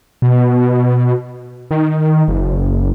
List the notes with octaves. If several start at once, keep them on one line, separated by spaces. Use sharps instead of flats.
B2
D#3
F#1